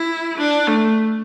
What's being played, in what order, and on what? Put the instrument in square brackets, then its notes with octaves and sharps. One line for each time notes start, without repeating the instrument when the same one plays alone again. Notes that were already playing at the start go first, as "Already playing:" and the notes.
Already playing: [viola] E4
D4
A3